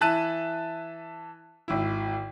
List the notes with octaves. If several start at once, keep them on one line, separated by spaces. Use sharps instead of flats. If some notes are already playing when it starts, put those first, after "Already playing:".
E3 E5 A5 F#6 D#7
G#1 E4